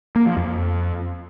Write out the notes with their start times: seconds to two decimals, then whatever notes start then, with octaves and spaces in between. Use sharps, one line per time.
0.16 A#3
0.26 F3
0.37 F2